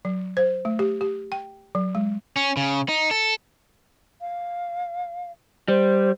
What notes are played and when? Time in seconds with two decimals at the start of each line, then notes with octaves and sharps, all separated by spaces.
0.05 F#3
0.37 C5
0.65 A3
0.79 G4
1.01 G4
1.32 G5
1.75 F#3
1.95 G#3
2.36 C#4
2.57 C#3
2.89 D#4
3.11 A4
4.21 F5
5.68 G3 C5